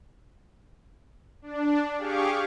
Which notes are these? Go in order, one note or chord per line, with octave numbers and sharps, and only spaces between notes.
D4
G4 G#4 F5 C#6 D6